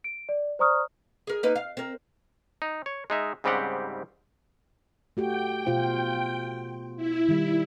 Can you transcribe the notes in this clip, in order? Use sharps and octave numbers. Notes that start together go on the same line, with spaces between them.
D7
D5
C5 D5 A#5 C#6 D#6 F6
G#4 A#4
A#3 D#4 B4
F5
C4 A#4
D#4
C#5
G#3 D#4 E5
G#2 C#3 G3 C4 G4 F#5
A3 F#4 G4 G5
B2 F4 C5
E4
D#3 G3